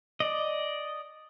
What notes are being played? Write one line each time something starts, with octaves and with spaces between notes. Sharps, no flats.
D5 D#5